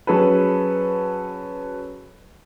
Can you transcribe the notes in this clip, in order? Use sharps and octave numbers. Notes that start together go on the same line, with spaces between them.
F#3 C#4 G#4 A4 B4